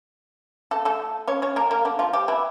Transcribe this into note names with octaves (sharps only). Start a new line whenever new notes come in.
A3 A4
A3 A4
C#4 C#5
C#4 C#5
A#3 A#4
A#3 A#4
D3 D4
F3 F4
G3 G4
E3 E4